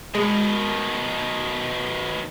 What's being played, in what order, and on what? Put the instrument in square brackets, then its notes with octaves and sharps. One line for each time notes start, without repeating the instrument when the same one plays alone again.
[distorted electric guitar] B2 D#3 [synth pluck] G#3